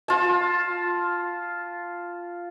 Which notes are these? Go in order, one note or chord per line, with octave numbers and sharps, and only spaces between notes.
F4 A5